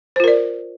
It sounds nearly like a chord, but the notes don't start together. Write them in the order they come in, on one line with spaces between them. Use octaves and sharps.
C5 F4 A#4 D5